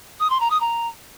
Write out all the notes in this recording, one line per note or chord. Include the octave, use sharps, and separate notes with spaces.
D#6
C6
A#5
D#6
A#5